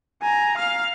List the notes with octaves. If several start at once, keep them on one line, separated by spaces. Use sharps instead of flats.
G#5 A#5
F5 F6